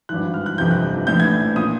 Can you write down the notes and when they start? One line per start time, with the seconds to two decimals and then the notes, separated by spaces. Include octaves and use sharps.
0.09 G#1 G2 E3 F#6
0.34 F6
0.46 F#6
0.58 G1 F2 C3 E3 G6
0.71 F#6
1.07 A#1 A2 E3 G6
1.20 G#6
1.56 A#2 D#6